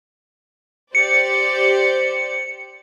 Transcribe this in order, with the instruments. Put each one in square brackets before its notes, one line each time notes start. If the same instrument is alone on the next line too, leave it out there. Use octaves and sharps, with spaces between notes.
[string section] G4 C5 D5 [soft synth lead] C#7